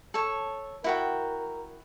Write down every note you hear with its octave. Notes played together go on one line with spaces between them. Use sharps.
A4 C#5
E4 F#4 A#4 G5